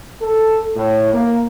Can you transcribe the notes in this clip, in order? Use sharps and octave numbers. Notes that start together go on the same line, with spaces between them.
A4
A2
A#3